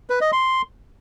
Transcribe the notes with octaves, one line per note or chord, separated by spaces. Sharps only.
B4
D#5
C6